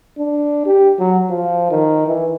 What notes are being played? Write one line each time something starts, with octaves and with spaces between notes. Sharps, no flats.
D4
G4
F#3
F3
D#3
E3